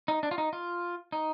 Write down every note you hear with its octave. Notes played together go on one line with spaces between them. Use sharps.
D#4
D4
F4
D#4
F4
D#4